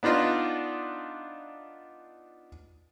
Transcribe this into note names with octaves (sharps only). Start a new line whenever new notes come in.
B3 D4 D#4 F4 D#5